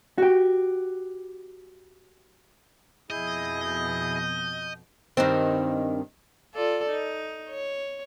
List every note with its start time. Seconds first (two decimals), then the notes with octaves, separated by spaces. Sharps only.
0.18 F#4 G4
3.10 F2 B2 E4 G#4 D#5 G6
3.65 G6
5.17 G2 D#3 C4
6.54 F4 A4 D5
6.90 D#4
7.49 C#5